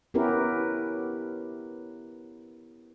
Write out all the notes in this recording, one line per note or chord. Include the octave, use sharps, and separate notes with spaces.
B3 C#4 E4 G4 A#4 B4